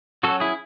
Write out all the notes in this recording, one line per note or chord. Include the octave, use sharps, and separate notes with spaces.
F#3 C#4 F#4 A4
E4 G#4